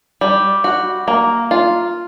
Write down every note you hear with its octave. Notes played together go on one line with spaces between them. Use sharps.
G3
F#4
A#3
F4